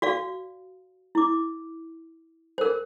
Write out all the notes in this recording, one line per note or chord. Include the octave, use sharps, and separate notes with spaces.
F#4 D5 F5
E4 D6
A#4 C5